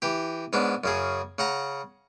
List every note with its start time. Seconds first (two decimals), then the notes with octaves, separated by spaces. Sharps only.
0.02 E3 G4
0.53 G#2 B3 C#4 D4
0.84 F#2 C#3 G#4
1.38 C#3 F#5 A#5